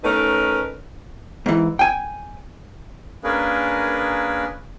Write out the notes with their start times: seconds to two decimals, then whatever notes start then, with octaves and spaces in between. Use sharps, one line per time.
0.04 A3 C#4 D#4 A#4 B4
1.46 G#2 E3
1.79 G5 G#5
3.24 A#3 C#4 D4 G#4 A#4 B4